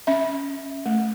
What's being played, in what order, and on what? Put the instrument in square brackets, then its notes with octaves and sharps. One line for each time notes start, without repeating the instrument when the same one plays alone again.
[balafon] C#4 E5
A3